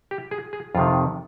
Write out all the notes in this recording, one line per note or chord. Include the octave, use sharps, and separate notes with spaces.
G4
G#4
G#4
F2 C3 D#3 F4